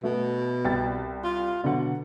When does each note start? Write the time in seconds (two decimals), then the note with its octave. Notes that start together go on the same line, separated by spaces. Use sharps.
0.04 B2 A3
0.65 C2 G5 A6
1.24 F4
1.64 B2 D3 F#3 F#5